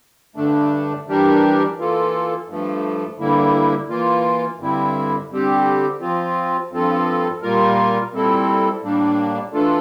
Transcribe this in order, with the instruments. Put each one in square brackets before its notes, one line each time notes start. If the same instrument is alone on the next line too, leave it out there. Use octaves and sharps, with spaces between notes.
[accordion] G2 D3 A3 D4
E3 G3 D4 G4 A#4
E3 A#3 F4 A4
G2 F3 A3
G2 D3 G3 A#3 E4
E3 A#3 F4
G2 D3 G3 C4 E4
D3 G3 C4 G4
F3 C4 F4
G2 F3 C4 F4 A4
A#2 G3 A#3 F4 A#4
A#2 G3 C4 E4 A4
A2 G3 A#3 D4
E3 A3 D4 F4 A4